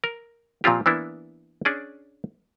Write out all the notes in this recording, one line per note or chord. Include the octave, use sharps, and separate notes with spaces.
A#4
A#2 F3 C4 F4 G4
E3 A#3 B3 D4 E4
C#4 D4 G#4 D5